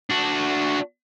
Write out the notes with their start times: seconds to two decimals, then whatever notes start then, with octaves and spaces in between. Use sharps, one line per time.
0.10 D4 F#4